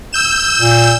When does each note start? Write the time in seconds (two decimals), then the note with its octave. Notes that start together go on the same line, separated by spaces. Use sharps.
0.13 E6 G6 E7
0.57 A#2